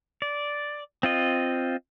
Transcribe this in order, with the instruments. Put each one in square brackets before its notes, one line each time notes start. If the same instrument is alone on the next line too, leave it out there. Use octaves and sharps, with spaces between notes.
[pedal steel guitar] D5
C4 F4 D#5